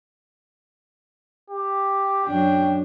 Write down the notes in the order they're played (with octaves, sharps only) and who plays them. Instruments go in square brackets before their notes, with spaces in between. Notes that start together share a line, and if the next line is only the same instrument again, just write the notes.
[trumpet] G4
[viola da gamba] F#2 D4 [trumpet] G5